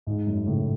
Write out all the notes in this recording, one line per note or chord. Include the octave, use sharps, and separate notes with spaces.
G#2
F#2
A2 C#3